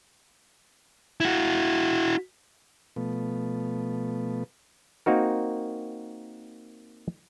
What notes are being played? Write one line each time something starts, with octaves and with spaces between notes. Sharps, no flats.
E4 F#4
B2 F3 A3 B3
A#3 C4 D#4 F#4 A#4